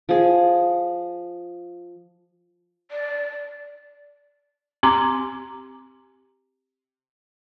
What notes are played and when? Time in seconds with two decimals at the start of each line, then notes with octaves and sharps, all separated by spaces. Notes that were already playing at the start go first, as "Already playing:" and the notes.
0.09 F3 G#4
2.91 D5
4.83 C4 G4 A#5 C6 D6